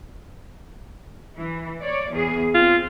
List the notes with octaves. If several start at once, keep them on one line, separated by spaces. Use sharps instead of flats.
E3
C#5 D5
E2 G#4
C4 F4